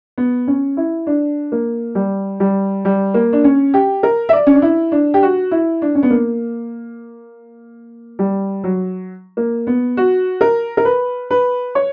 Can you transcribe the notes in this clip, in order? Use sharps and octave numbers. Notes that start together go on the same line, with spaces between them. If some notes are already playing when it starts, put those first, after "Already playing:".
B3
C#4
E4
D4
A#3
G3
G3
G3
A#3
D4
C#4
G4
A#4
E5
D5
C#4
D4
E4
D4
G4
F#4
E4
D4
C#4
B3
A#3
G3
F#3
A#3
B3
F#4
A#4
A#4
B4
B4
C#5